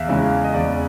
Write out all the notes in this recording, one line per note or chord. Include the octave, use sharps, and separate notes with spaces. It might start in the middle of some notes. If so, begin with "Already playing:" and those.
Already playing: E2 E5 F5
C#3 E3 G#3
F5
D#5
E2 D5